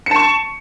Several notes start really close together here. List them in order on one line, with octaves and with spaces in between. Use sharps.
C#7 A5 C#6